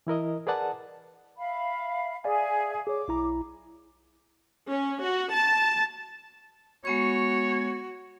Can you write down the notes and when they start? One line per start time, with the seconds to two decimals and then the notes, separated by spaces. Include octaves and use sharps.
0.07 E3 E4 A#4 D#5
0.47 G#4 A#4 B4 D5 F#5 A5
1.38 E5 F5 B5
2.24 G#4 D5 E5 F5 G#5
2.87 G#4 C#5 D6
3.08 B1 E4 A#5
4.69 C#4
5.03 F#4
5.33 A5
6.85 G#3 B3 F#4 C#5 C#6